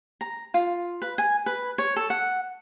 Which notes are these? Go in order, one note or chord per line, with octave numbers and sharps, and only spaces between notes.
A#5
F4
B4
G#5
B4
C#5
A4
F#5